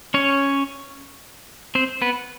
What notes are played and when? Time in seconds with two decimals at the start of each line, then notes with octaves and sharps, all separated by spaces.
0.14 C#4 C#5
1.75 C4 C5
2.02 B3 B4